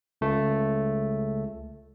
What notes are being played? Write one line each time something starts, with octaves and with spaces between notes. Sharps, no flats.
C#2 A3